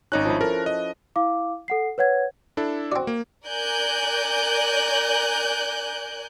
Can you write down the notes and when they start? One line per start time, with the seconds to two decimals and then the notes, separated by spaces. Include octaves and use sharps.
0.12 G#1 C#4 D#4 D#5 F#6
0.25 F3 E4
0.41 A4 A#4
0.66 D#5
1.16 E4 F5 D6
1.68 A4 F#5 C7
1.98 B4 C#5 F#5 G#6
2.57 D4 E4 A4
2.92 C4 F#4 D5
3.07 A#3
3.46 A#4 D5 G#5 F#6 G6